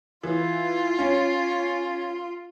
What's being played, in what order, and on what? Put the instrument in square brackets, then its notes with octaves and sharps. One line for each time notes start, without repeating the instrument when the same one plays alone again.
[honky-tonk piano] E3 [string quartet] F4
[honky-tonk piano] C#4